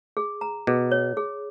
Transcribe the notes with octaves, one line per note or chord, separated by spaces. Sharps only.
G#4
A#5
B2 G#4
C#5
G#4